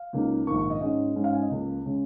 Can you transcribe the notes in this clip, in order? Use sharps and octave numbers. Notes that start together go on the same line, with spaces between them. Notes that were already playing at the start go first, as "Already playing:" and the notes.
Already playing: F5
C#2 C#3 A#3 D#4
A#1 G#2 D#3 A#3 C#6
C#6
D#5
G#2 G#3 C#4 D#5
G#2 G#3 C#4
F5
G#5
D#5
C#2 C#3 A#3
C#3 G#3 C#4